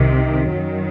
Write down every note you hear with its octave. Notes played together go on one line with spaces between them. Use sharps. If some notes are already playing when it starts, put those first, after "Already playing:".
Already playing: C2 C3 D#3
F#2 D#3 F#3